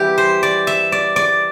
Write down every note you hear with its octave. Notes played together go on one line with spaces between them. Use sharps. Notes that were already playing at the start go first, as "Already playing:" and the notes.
Already playing: E3 G3 C4 E4 G4
C5
D5
E5
D5
D5